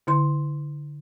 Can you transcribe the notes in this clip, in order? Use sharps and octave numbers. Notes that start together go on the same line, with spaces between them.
D3 E4 C6